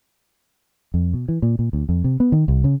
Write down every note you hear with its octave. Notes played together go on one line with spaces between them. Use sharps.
F2
B2
E3
A#2
A#2
D2
F2
C3
B3
D#3
C2
C#3